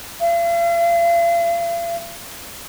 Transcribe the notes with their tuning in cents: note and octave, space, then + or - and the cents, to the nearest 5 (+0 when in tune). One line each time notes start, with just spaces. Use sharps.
F5 -45